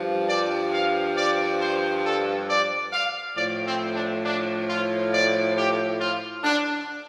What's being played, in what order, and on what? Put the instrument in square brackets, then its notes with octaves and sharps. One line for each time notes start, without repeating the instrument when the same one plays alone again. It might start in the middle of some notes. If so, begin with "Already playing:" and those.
Already playing: [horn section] G2 F3
D5
F5
D5
C5
A4
D5
F5
A2 F3 D5
C4
D4
D4
F4
D5
G4
F4
D4